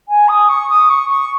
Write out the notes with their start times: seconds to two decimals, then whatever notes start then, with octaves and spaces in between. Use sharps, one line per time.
0.08 G#5
0.28 D#6
0.49 C#6
0.69 D#6
0.89 C#6
1.09 C#6